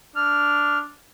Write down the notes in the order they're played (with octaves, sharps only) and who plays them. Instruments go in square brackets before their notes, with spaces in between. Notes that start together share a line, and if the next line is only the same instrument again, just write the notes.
[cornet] D4 [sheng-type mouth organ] F6